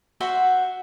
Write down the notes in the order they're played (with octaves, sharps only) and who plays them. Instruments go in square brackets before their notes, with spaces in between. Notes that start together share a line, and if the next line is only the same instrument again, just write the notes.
[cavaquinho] F#4 C5 E5 F#5